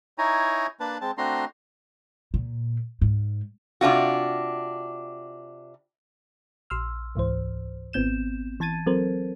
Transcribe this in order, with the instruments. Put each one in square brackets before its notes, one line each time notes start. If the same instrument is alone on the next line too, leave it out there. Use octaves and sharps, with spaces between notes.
[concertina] D#4 E4 C#5 G#5 A#5
A#3 D4 B4 A5
G#3 C4 A5
A3 C4 D4 F#4 A#5 C6
[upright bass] A#2
G#2
[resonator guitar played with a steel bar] C3 D4 F4 F#4
[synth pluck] A#1 C6 E6 F6
C#2 G#2 E3 C5
G#1 B3 C4 G6 E7
E3 A5 G#6 A6 D#7
F#3 C4 A4 A#4 C5